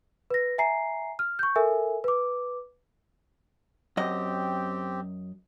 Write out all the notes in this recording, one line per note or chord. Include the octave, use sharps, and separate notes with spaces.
B4 A#6
E5 G#5 A#5 C7
F6
C#6 G6
A4 A#4 E5 G#5
B4 D6
F#2 C4 G4 D#5